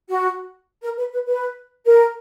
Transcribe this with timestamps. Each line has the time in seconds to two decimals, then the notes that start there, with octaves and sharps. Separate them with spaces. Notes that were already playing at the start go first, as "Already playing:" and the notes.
0.09 F#4
0.83 A#4
0.98 B4
1.12 B4
1.26 B4
1.85 A#4